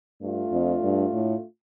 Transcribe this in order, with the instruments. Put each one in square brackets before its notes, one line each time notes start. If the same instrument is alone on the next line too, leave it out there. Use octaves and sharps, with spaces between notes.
[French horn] G2 [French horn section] A3 D4 F4
[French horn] F2
G2
A2